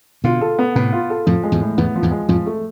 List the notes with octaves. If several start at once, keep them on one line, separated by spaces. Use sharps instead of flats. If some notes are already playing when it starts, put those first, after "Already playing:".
B2 D3 F4
A4
B3
A2 C3 B3
F4
A4
F2 A2 F3
G#3
E2 G#2
A2
E2 G#2 B3
F3
E2 G#2
G#3
F2 A2 F3
A3